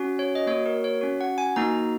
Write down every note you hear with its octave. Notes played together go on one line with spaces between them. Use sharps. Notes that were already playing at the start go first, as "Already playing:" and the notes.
Already playing: C#4 F#4
C#5
D#5
A#3 F#4 C#5
A#4
C#5
C#4 F#4
F#5
G#5
A#3 D#4 F#4 A#5